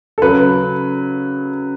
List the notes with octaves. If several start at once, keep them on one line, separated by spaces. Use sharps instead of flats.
A4
C#3 F#3 B4